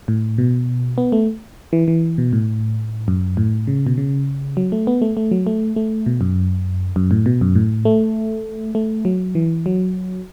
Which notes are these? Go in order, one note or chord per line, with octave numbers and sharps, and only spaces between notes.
A2
B2
B3
A3
E3
E3
B2
A2
F#2
A2
C#3
B2
C#3
F#3
A3
B3
A3
A3
F#3
A3
A3
B2
F#2
F#2
A2
B2
F#2
A2
A3
A3
F#3
E3
F#3